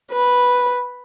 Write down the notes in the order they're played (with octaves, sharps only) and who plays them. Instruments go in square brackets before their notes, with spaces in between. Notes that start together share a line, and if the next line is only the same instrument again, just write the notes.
[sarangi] B4